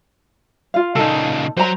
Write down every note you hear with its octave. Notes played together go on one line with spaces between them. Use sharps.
F4 F5
A#2 C#3 D#4 A4
F#3 C5 A#5